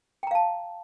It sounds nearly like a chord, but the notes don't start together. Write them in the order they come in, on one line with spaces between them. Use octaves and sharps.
G5 A#5 F5 A5